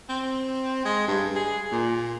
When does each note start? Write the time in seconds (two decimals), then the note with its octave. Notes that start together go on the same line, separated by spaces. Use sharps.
0.09 C4
0.85 G#3
1.08 G2
1.36 G#4
1.72 A#2